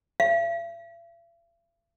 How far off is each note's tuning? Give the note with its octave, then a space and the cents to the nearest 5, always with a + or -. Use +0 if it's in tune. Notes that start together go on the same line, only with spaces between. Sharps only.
E5 +45